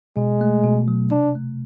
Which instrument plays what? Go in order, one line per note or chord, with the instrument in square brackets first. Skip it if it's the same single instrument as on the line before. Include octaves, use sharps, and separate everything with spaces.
[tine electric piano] B2 [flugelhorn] G#3
[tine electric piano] A3
B2
F#3
[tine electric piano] C3 [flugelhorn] D4
[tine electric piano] A3